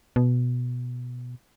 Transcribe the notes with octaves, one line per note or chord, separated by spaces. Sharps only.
B2